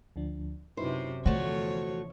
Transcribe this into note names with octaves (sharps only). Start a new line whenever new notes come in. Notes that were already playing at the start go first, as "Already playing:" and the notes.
D2 F3 D4
F#2 C3 D#4 E4 B4 C5
E2 D3 F3 A3 F#4 C5 C#5